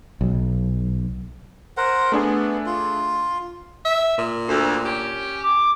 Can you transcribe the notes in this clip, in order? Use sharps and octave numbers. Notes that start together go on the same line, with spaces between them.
B1
A#4 C5 F#5
A3 B3 D4 G#4
F4
E5
A#2
D2
C#4 G4
D6